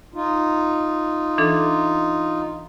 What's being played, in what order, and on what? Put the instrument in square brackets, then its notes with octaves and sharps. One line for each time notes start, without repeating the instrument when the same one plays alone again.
[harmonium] D#4 F4
[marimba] E3 D4 A4